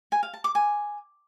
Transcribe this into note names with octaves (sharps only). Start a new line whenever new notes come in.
G#5
F5
A5
D6
G#5